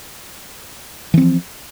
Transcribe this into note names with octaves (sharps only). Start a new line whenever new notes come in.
E3 F3 C4